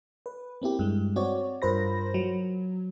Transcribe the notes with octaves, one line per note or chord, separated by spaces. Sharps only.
B4
A#3 C4 E4 G4
G2 G#3
C4 F#4 C#5 D5
G2 F4 A#4 C5 B5 A#6
F#3